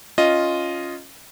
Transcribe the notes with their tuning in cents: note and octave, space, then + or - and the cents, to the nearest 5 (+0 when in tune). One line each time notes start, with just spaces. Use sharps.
C#4 +0 F4 +0 D#5 +0